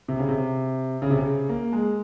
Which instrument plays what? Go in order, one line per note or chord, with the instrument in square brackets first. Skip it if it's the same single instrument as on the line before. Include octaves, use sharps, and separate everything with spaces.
[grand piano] C3
C#3
C3
C#3
C3
C#3
A#3
G#3